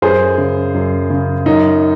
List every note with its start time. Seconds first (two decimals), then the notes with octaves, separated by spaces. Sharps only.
0.02 F#2 G#4 C5
0.38 C#3
0.74 F#2
1.10 C#3
1.46 F#2 D#4